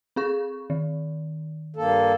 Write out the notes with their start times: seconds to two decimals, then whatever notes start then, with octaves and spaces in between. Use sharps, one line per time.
0.16 C4 G#4 C#6
0.70 D#3
1.76 G2 A#3 A4